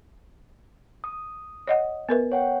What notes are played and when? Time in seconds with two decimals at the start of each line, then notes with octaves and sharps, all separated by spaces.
1.04 D#6
1.67 C#5 D#5 F#5
2.09 B3 A#4 B4
2.32 C#5 F#5 G5